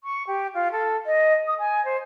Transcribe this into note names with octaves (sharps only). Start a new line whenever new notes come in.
C#6
G4
F4
A4
D#5
D#6
G#5
C5